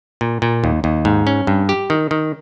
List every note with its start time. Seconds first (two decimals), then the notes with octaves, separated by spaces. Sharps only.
0.21 A#2
0.42 A#2
0.64 D#2
0.84 D#2
1.05 G#2
1.27 C#4
1.47 G2
1.69 G4
1.90 D#3
2.11 D#3